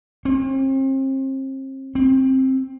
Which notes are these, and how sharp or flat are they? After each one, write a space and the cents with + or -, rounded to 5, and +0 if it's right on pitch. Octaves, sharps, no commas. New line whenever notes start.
C4 +35
C4 +15